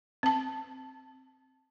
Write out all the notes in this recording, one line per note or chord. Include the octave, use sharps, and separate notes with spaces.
C4 A5